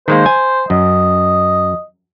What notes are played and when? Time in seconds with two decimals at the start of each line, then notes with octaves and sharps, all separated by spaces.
0.08 D#3 G#3 A#3 C5
0.26 G#5
0.70 F#2 D#5